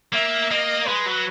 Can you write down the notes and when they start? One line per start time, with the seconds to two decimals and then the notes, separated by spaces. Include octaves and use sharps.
0.13 A#3 E5
0.50 A#3 D#5
0.87 G#3 B4
1.06 F#3